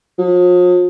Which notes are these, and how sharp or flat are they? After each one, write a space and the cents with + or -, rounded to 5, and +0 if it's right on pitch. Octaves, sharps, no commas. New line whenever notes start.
F3 +45